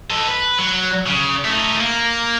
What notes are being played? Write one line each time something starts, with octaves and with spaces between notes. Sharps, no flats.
A4 D#5
B4
F#3
C#3
A3 D#4
A#3